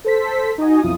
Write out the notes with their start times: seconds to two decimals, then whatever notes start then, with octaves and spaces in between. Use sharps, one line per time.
0.05 A4 C5 B6
0.58 D#4 F#4 D#5 G#5
0.82 B1 F2 E4 F4 D#6